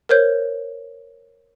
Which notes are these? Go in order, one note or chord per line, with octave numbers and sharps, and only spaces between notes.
A#4 C5 C#5 G6